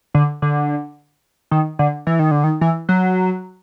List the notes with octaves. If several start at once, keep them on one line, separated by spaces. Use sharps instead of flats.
D3
D3
D#3
D3
E3
D#3
D3
D#3
E3
F#3